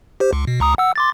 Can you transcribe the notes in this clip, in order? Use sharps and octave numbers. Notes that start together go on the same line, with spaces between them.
G4 C5
C#2
B2
C#2 A#5 D#6
F#5 E6
C6 D6 A6